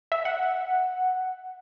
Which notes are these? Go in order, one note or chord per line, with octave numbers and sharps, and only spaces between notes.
E5
F#5